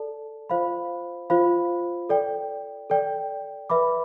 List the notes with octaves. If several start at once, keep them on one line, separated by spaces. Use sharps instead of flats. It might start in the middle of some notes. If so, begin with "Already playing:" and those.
Already playing: A4 D5 A5
F4 C5 F5 B5
F4 C5 F5 B5
A4 D5 G5
A4 D5 G5
B4 E5 B5 D6